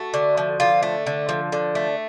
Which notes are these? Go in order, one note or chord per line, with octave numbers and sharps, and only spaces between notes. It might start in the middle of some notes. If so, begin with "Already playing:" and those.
Already playing: A3 F#4
D3
F3
D3 F4
A3
D3
F3
D3
A3